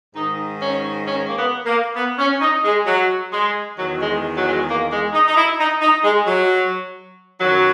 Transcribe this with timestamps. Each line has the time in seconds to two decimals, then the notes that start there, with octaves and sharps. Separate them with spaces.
0.14 G#2 D#3 D#4
0.60 C#4
1.05 C#4
1.25 A#3
1.35 B3
1.65 A#3
1.95 B3
2.19 C#4
2.41 D#4
2.64 G#3
2.86 F#3
3.32 G#3
3.76 D#3 F#3
3.79 E2
3.99 G#3
4.33 F#3
4.45 G#3
4.68 A#3
4.90 G#3
5.12 D#4
5.26 D#4
5.36 E4
5.59 D#4
5.81 D#4
6.03 G#3
6.26 F#3
7.40 F#2 D#3 F#3